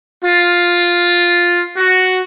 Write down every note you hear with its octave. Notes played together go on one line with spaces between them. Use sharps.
F4
F#4